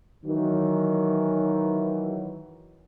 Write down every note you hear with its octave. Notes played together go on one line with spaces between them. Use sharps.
D#3 E3 F#3